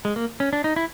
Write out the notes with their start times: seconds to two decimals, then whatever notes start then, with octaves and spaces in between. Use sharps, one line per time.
0.05 G#3
0.16 A#3
0.40 C#4
0.53 D4
0.64 D#4
0.76 E4